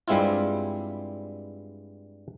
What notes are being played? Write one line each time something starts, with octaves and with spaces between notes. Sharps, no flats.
G2 G3 G#3 C4 E4 F4